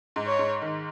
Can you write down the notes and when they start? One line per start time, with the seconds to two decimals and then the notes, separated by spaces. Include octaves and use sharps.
0.16 G#2
0.27 C#5
0.39 G#2
0.62 D#3